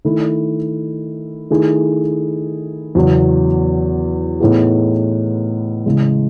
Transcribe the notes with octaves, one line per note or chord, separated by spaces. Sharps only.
D#3 A3 E4
D#3 A3 E4 G#4
E2 C#3 F#3 B3
A2 E3 B3 D#4 G#4
C#3 E3 G#3